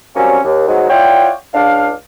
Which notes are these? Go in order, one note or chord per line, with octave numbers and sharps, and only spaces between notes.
F#3 G3 A#3 C4 C#4
D#2
G#2 F#3 G#3 B3 F#4
E4 F4 C#5 D5 F#5 G5
C#2 D4 F5